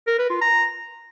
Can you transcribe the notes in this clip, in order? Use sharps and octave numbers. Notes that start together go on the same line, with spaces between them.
A#4
B4
F4
A#5